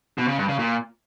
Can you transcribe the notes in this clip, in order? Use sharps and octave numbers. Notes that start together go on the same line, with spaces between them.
B2
C#3
G2
C#3
A#2